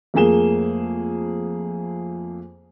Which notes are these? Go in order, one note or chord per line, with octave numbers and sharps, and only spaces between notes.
F2 A3 A#3 G#4 E7 G7